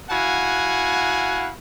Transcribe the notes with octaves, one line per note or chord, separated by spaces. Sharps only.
E4 F#4 F5 F#5 G#5